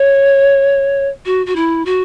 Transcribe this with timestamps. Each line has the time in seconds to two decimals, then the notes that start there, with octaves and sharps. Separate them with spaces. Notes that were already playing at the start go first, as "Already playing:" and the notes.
Already playing: C#5
1.25 F#4
1.46 F#4
1.55 E4
1.85 F#4